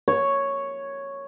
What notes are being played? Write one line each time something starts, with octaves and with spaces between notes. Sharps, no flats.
C#5